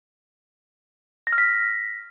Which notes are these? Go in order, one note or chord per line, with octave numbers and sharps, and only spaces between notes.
A#6
F6
B6